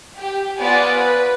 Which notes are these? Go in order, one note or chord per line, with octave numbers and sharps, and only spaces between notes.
G4
B3 F4 D5 F#5 G#5
B4